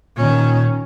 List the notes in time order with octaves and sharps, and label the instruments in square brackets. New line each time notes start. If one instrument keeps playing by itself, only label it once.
[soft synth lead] A#2 [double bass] D#3 C#4